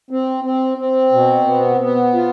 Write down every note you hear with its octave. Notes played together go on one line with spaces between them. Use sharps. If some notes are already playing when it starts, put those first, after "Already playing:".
C4
C4
C4
B2
B3
B3
F4